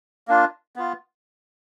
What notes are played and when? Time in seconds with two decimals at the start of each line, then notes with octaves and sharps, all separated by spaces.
0.28 A#3 D4 F4
0.76 B3 F4